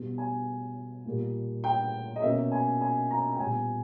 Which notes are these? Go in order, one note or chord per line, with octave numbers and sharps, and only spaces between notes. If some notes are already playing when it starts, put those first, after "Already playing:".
Already playing: B2 G3 B3
G#5
A#2 G3 A#3
G5
D#5
B2 A#3 C#4 E5
G#5
G#5
A#5
G5
A#2 G3 B3 G#5